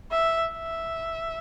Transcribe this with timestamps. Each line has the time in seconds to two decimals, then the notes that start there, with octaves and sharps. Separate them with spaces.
0.12 E5
0.52 E5